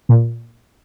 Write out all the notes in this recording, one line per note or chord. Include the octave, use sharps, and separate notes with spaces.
A#2